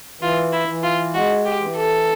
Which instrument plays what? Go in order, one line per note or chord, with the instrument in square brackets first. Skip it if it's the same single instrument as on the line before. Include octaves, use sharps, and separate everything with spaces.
[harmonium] E3 [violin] F4
[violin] E4
[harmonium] E3
[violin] F4
[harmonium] G#3 [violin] F#4
[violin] G4
[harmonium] E3
[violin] A4